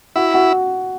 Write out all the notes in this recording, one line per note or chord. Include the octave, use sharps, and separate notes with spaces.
E4 F#4
F#4